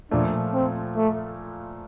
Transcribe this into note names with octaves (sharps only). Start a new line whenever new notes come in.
A#2 F3 A3 D4
C4
A3